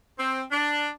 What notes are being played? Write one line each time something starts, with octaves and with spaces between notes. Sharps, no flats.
C4
D4